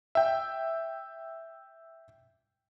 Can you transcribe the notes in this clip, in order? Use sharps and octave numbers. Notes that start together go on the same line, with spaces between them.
E5 G5